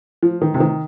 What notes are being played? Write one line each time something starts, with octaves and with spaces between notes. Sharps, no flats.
F3
D#3
C3
D#3